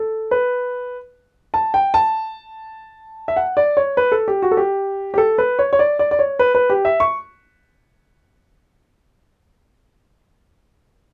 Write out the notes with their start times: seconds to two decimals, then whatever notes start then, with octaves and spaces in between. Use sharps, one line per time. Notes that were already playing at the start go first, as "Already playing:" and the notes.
Already playing: A4
0.31 B4
1.54 A5
1.74 G5
1.94 A5
3.28 E5
3.36 F#5
3.57 D5
3.77 C#5
3.97 B4
4.12 A4
4.28 G4
4.42 F#4
4.51 A4
4.57 G4
5.14 G4
5.18 A4
5.38 B4
5.59 C#5
5.73 C#5
5.79 D5
5.99 D5
6.11 D5
6.19 C#5
6.39 B4
6.55 B4
6.70 G4
6.85 E5
7.00 C#6